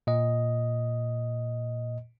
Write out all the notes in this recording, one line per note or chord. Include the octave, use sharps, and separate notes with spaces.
A#2 D#5